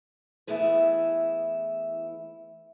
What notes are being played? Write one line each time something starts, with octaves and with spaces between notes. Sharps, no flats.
E3 A3 B3 E4 G#4 B4